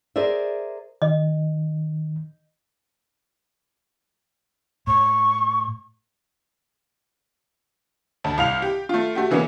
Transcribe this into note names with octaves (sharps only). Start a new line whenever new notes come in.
G#4 A#4 C5 D5 E5
D#3 D#5
A2 C#6
D2 A5
C2 F5 F7
G4
A3 F4
A3 F#4 G4
C#3 E3 A#3 B3 C#4